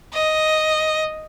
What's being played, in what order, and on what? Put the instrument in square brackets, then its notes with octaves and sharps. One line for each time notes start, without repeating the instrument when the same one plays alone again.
[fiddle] D#5